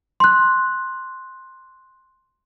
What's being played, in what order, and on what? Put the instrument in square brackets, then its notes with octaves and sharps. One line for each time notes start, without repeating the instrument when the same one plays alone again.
[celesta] C6 F#6